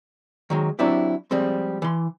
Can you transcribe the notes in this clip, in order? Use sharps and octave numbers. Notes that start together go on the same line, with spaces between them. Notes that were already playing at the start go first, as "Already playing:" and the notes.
D#3 F#3 G#3
F#3 C4 D4 E4 G4
F3 G3 G#3 C4
E3 C6